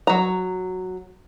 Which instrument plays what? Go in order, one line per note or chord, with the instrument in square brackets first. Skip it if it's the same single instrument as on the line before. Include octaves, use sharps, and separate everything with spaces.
[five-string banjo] F#3 A#5